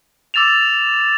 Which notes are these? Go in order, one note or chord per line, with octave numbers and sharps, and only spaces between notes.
D6 E6 A6 E7 F7